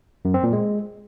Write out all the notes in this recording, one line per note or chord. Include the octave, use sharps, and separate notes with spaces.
F#2
C4
A#2
G#3